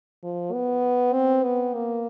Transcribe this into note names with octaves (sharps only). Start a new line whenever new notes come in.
F3
B3
C4
B3
A#3